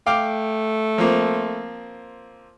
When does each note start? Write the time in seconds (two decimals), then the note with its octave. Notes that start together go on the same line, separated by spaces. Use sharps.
0.06 A3 F5 G5 D6
0.98 F3 A#3 C4